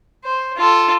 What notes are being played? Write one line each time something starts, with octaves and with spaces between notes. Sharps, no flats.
C5
F4 A4